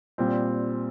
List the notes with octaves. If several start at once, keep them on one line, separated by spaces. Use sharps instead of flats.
A#2 G3 C4